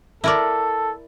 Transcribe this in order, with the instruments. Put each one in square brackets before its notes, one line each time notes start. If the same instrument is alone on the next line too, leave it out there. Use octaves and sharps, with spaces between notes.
[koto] E4 A#4 D5 [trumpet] A4